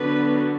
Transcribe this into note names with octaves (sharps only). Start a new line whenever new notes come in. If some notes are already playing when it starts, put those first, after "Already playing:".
Already playing: D3 F#3 B3 B4